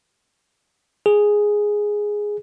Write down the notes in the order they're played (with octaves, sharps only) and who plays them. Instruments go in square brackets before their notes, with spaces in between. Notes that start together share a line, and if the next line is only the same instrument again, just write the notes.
[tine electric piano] G#4